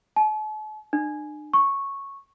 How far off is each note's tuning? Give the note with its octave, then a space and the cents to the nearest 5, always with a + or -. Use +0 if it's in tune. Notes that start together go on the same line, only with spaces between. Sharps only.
A5 -45
D4 +45
C#6 -5